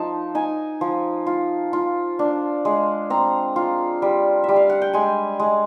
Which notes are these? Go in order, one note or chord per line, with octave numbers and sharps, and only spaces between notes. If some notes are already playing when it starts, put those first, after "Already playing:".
Already playing: F3 D#4 A5
D#4 G#5
F3
F4
F4
D4
G#3
C4 A#5
F4
G3
G3 E5
F5
F#5
G5
G#3 G#5
G#3